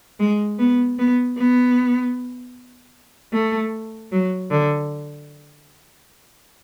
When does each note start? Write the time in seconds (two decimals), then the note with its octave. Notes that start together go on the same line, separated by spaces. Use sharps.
0.20 G#3
0.59 B3
0.99 B3
1.37 B3
3.33 A3
4.12 F#3
4.51 D3